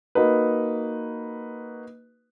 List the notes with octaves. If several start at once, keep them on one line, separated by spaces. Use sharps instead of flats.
A#3 D#4 F#4 B4